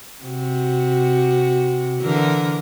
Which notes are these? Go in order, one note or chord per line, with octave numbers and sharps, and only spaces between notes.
C3 F#4
D3 E3 A#4